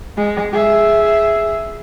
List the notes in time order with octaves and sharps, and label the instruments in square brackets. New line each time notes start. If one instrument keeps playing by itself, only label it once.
[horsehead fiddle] G#3
G#4 E5